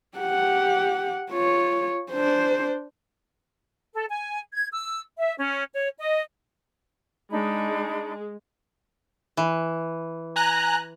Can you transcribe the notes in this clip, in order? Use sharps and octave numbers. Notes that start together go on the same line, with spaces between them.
G4 F#5
F4 C#5
D4 C5
A4
G#5
G#6
E6
E5
C#4
C#5
D#5
G#3 D4 D#4 B5
E3
G#5 A#5 F#6